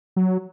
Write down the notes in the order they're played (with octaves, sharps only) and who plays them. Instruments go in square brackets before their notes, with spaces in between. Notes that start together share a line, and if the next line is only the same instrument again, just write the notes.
[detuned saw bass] F#3